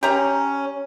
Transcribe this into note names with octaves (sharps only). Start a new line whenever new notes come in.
C#4 G4 A#5